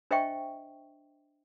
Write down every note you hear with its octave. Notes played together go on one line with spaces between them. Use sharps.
D4 C5 D#5 E5 G5 C#6